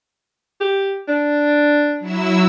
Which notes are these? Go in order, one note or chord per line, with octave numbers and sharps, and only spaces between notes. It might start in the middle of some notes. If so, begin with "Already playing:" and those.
G4
D4
F#3 E4 E6